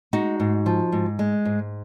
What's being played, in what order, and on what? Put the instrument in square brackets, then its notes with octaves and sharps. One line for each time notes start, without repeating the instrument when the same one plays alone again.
[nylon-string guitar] G#3 D#4 F#4
G#2
F3
G#2
G#3
G#2